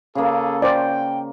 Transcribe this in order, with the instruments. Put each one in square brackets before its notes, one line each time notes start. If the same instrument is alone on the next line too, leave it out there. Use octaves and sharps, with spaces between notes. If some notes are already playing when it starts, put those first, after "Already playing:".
[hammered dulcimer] C#3 A#3 [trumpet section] G#4 A4
[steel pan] C5 D5 [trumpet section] G5